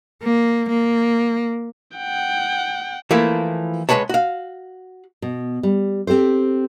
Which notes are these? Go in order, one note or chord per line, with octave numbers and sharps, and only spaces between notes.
A#3
A#3
F#5 G5
E3 F3 A3 A#3 E4
C#2 G#3 A#3 B4 C#5 A5
F#4 F5
B2
G3
C4 G4 A4 C5